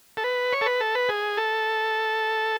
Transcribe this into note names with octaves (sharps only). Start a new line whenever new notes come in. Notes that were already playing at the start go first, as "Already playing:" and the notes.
A4
B4
C#5
A4
B4
A4
B4
G#4
A4